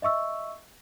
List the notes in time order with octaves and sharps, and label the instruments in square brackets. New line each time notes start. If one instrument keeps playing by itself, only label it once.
[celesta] D#5 E5 C#6 E6